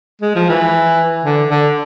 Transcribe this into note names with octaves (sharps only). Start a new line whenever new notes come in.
G#3
F3
E3
D3
D3